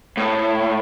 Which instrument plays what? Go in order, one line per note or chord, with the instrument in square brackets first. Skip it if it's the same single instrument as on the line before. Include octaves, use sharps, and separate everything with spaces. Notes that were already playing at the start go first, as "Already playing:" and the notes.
[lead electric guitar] A2